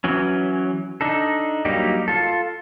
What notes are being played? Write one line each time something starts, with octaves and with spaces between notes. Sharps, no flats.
E3 F#3 C#4
D4 D#4 A4
F#3 G3 A#3 D#4 G4
F4 A4